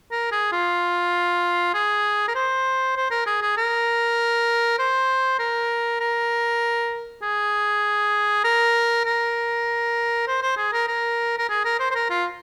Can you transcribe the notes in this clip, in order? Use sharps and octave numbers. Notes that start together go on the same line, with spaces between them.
A#4
G#4
F4
G#4
A#4
C5
C5
A#4
G#4
G#4
A#4
C5
A#4
A#4
G#4
A#4
A#4
C5
C5
G#4
A#4
A#4
A#4
G#4
A#4
C5
C5
A#4
F4